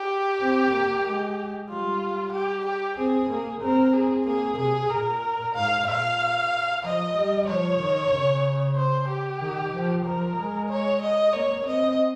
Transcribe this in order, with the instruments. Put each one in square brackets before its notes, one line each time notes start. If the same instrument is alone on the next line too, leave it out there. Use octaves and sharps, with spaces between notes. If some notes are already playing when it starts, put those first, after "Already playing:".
Already playing: [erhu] G4
[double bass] C4
A#3
G#3
[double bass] G3 [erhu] F4
[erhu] G4
G4
[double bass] C4 [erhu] G#4
[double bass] A#3
[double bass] C4 [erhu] A#4
[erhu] G#4
[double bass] A#3 [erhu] G#4
[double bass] C3 [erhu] G#4
[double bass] A#2 [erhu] A#4
[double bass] G#2 [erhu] F5
[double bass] A#2 [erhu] F5
[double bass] F3 [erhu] D#5
[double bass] G3
[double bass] F3 [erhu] C#5
[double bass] D#3
C#3
[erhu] C5
G4
[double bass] D#3
F3
[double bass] F3 [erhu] A#4
[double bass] G#3
[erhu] C#5
D#5
[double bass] A#3 [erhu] C#5
[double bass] C4 [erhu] D#5